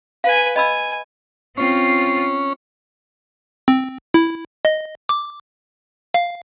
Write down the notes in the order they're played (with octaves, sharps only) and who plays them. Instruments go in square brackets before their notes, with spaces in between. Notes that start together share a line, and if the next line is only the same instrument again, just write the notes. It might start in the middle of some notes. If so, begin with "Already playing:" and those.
[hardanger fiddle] B4 G#5 [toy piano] F5
[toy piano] D#5 B5 E6 [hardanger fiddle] G#5
[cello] C4 F4 [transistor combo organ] C#4
[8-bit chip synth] C4
E4
D#5
D6
F5